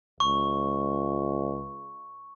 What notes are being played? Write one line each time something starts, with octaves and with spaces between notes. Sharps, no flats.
C#2 C#6